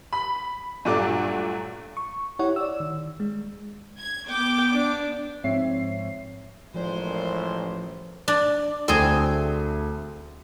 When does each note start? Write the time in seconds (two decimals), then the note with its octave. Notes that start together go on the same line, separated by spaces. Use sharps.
0.13 B5
0.85 G2 A#2 F#3 A3 D4 D6
1.97 C#6
2.39 E4 G4 C#5 F#5
2.56 D5 E6
2.80 D#3
3.20 G#3
3.99 G#6
4.29 B3 G5 D6
4.73 D4
5.44 G#2 F3 C4 C#5 E5 C7
6.74 A1 F#2 A#2 F3 G#3 C5
8.28 D4
8.88 D2 A3 C4 G#4 D#7